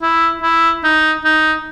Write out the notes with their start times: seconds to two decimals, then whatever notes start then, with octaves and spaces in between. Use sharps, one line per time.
0.02 E4
0.42 E4
0.84 D#4
1.25 D#4